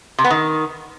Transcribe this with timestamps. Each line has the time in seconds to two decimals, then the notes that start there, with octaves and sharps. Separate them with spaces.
0.19 C3
0.24 B3
0.30 D#3